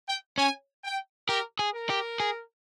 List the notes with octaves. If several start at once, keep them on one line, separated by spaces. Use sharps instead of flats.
G5
C#4 G#5
G5
G4 A#4
G#4
A#4
G4
G#4